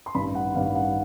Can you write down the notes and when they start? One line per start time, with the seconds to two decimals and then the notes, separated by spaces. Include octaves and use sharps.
0.06 C6
0.15 A1 G2 D#3 B5
0.35 F#5
0.55 A1 G2 D#3 F5
0.76 F#5